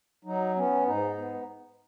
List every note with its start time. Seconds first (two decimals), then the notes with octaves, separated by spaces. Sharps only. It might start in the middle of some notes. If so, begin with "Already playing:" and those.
0.25 F#3 D#4
0.55 B3 C#4
0.86 G#2 D#4
1.18 B3